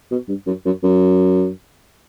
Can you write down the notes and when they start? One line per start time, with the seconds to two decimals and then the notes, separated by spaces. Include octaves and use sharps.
0.11 B2
0.28 G2
0.47 F#2
0.66 F#2
0.83 F#2